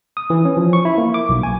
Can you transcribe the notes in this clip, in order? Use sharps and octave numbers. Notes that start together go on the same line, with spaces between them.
D#6
E3
C#4
F3
C#6
E4
A#3
D6
B1
G#5